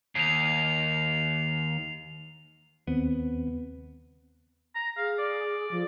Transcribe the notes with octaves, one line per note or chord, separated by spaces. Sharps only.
D#2 C7 F7
D#2 B3 C4
A#5
G#4 F5
D5
F3